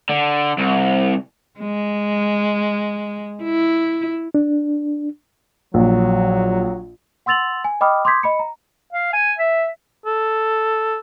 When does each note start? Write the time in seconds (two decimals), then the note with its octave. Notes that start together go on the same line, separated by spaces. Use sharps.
0.09 D3
0.58 C2
1.59 G#3
3.44 E4
4.34 D4
5.74 A#1 F#3
7.26 F#5 C6 E6 A6 F7 F#7
7.64 G#5
7.81 D#5 G5 B5 D6 D#6 F6
8.05 C6 D6 D#6 G6 G#6 B6
8.23 D#5 B5 C#7
8.39 A#5
8.93 F5
9.13 G#5
9.38 E5
10.06 A4